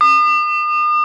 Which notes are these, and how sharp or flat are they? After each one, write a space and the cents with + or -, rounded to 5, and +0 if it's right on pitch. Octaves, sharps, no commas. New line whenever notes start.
D#6 -45